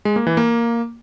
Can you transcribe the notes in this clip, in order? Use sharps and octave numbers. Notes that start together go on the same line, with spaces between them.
G#3
A#3
E3
A#3